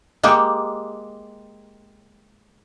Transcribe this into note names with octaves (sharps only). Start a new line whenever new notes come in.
G#3 A#3 G4